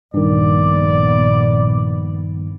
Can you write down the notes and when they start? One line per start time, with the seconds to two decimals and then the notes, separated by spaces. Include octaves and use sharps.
0.14 A#1 G2 A#2 D#3 B3 D5